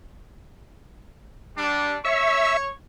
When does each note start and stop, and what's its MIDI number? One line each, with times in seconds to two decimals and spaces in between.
1.56 1.96 55
1.56 1.96 62
2.05 2.68 73
2.05 2.57 76
2.05 2.68 85